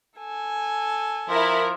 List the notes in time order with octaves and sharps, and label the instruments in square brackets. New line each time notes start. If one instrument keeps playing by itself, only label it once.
[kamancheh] A4 G#5
[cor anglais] F3 [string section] E4 A#4